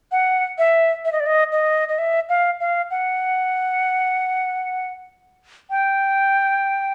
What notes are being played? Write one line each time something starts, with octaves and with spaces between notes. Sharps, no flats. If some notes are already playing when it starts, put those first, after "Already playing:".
F#5
E5
E5
D#5
D5
D#5
D#5
D#5
E5
F5
F5
F#5
G5